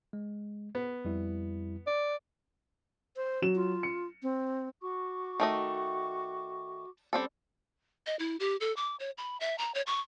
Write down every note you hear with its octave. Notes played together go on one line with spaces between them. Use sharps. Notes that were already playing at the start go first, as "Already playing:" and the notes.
G#3
B3
F2 G3 E4
D5
C5
F#3 E7
F4
C#7
C4
F#4 C#6 D6
D#3 A3 D#5
G3 C4 C#4 A4 D5 C6
D#5
E4
G4
A4
D6
C#5
B5
E5
A#5
C#5
C#6